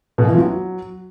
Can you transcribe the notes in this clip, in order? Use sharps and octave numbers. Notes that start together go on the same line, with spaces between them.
B2
F#2
E3
F3
F#3